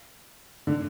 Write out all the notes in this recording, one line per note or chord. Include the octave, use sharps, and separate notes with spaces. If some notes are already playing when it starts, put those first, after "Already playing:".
D3